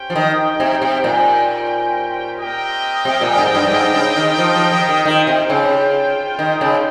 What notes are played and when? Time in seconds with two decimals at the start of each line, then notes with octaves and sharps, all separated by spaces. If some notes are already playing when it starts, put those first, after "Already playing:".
Already playing: C#4 G4 C5 G5
0.10 F3
0.15 D#3
0.60 C3
0.82 C3
1.04 A#2
2.38 C4 G4 A#4 D#5 G5
3.05 C3
3.21 A#2
3.38 G#2
3.55 G2
3.72 G#2
3.94 C#3
4.16 D#3
4.39 F3
4.55 F3
4.72 D#3
4.89 D#3
5.05 D#3 F4 C5 G5
5.27 C3
5.50 C#3
6.39 D#3
6.61 C#3